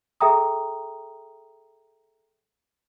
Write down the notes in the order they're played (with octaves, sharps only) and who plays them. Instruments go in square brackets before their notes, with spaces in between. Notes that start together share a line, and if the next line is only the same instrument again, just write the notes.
[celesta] G#4 A4 E5 G5 A#5 D#6